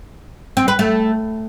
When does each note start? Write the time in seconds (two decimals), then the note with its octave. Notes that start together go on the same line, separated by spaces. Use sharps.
0.57 C4
0.68 B4
0.79 A3